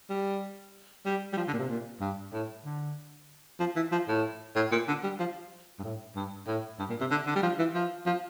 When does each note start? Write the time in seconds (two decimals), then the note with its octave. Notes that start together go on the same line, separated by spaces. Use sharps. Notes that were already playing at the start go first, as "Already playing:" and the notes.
0.10 G3
1.06 G3
1.33 G3
1.37 F3
1.48 D3
1.53 A#2
1.59 C3
1.69 A#2
2.01 G2
2.33 A2
2.65 D3
3.60 F3
3.76 E3
3.92 F3
4.08 A2
4.56 A2
4.72 A#2
4.88 D3
5.03 G3
5.19 F3
5.79 G2
5.83 A2
6.15 G2
6.47 A2
6.79 G2
6.90 A#2
7.00 C3
7.11 D3
7.27 D3
7.36 G3
7.43 F3
7.59 E3
7.74 F3
8.06 F3